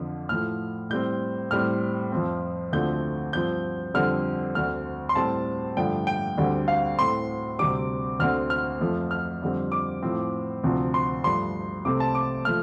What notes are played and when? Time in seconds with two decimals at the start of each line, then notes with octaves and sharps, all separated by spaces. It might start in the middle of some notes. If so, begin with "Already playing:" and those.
Already playing: F2 D3 F3
0.29 A2 F3 A3 F6
0.90 A2 G3 C4 G6
1.51 A2 G3 C4 F6
2.12 F2 F3 C4
2.73 D2 D3 F3 A3 C4 G6
3.33 G2 F3 C4 G6
3.94 F2 D3 G3 C4 F6
4.55 D2 D3 A3 C4 F6
5.09 C6
5.15 A2 G3 C4 A5
5.77 G2 D3 F3 A3 G5
6.07 G5
6.38 D2 D3 G3 C4
6.68 F5
6.99 A2 A3 C4 C6
7.59 D2 C3 G3 C4 D6
8.19 D2 D3 A3 C4 F6
8.50 F6
8.80 F2 F3 A3
9.11 F6
9.42 F2 D3 G3 C4
9.72 D6
10.03 A2 F3 C4
10.63 D2 C3 F3 C4
10.94 C6
11.24 G2 F3 A3 C6
11.85 C2 C3 A3 C4 D6
12.00 A5
12.15 D6
12.45 F3 A3 F6